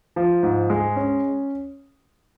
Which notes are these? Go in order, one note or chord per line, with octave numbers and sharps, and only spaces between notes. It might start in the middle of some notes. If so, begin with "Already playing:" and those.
F3
G#2
G#3
C#4